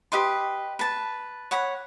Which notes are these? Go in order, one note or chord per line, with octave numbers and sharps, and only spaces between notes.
G4 B4 D#5 C6
B4 A5
C#5 F#5 B5